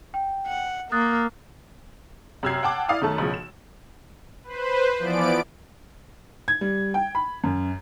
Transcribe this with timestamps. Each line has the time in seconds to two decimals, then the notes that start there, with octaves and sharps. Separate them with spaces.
0.14 G5
0.46 F#5
0.92 A#3 D#6 F#6 A6
2.43 F#2 C3 E6 F6 G#6 C7
2.63 F#5 G5 A5 D6
2.89 E4 D5 F5 D#6
3.01 F#2 D#3 A3 A5
3.18 B1 C#3 F3
3.34 E7
4.44 B4 C5
4.99 E3 F3 B3 D5 D7
6.48 G#6
6.61 G3
6.94 G5
7.15 B5
7.44 F#2